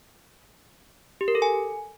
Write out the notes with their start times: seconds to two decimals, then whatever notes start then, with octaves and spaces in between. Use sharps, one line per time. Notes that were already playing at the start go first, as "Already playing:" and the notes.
1.21 G4
1.28 A#4
1.35 A4
1.42 G#5